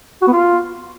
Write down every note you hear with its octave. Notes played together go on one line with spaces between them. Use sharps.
F#4
B3
F4